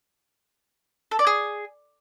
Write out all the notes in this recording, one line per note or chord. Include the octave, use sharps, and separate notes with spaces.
A4
D5
G#4